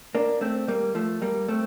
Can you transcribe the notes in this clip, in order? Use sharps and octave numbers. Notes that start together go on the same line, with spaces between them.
A#3 D4
A3 C4
G3 A#3
F3 A3
G3 A#3
A3 C4